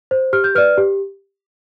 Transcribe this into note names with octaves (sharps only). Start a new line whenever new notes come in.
C5
G4 F6
G6
B4 D5 F6
G4